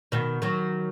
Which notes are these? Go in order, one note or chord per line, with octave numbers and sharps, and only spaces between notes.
B2 D#3
D#3 F#3